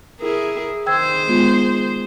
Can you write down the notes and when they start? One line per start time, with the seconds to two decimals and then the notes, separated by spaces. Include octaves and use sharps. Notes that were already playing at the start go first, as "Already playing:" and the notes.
0.20 E4 G#4 A#4
0.86 D#3 G#4 C5 G5 E6 G#6
1.27 G#3 B3 F4